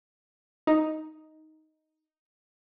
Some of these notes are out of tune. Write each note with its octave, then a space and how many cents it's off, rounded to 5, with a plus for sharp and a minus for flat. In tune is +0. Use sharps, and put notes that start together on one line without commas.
D#4 +5